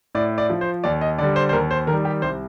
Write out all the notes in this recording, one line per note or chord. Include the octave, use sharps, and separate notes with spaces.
A2 D5
D5
F3
C5
D#2 D5
D#5
D3 G3 D5
C5
C5
D#2 A#4
C5
D#3 A#4
G3
G4
C2 C5